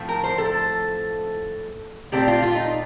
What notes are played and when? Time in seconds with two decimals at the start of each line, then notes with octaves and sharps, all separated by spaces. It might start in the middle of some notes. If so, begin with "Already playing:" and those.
Already playing: A2 F3 A3 C4
0.09 A#4
0.24 C5
0.38 A4
2.12 A#2 A3 C4 G4
2.28 F4
2.42 F4
2.56 D#4